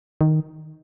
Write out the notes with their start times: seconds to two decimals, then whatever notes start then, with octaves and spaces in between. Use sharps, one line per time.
0.21 D#3